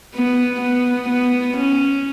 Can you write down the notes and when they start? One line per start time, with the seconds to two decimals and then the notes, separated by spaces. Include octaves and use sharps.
0.15 B3
0.62 B3
1.09 B3
1.58 C#4